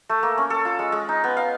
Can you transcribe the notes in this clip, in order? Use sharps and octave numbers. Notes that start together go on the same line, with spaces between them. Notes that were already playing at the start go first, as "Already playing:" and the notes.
A3
A#3
C#4
A4
F4
G#3
G#3
D#4
B3
F5